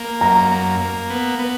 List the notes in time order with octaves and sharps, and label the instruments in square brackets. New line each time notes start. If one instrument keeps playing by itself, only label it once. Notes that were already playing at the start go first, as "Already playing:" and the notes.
Already playing: [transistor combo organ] A#3
[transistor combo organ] F#2 [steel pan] A#5
[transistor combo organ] A#3
A#3
B3
B3